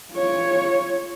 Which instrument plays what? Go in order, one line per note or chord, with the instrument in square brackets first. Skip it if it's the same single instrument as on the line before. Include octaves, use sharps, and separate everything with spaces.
[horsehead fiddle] F4 C#5